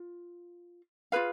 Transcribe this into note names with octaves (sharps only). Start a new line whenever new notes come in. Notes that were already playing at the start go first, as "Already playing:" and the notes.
Already playing: F4
F4 G#4 B4 F5